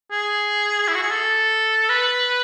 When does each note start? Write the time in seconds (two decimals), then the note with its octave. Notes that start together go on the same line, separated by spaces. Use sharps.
0.11 G#4
0.88 E4
0.95 F#4
1.03 G#4
1.11 A4
1.89 B4